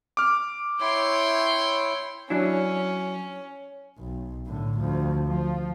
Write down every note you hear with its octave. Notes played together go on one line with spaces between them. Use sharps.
D6 F6
E4 C#5 G5 C6
F#3 C#4 D4 E4
B1
A2 D3
D2 F3
F3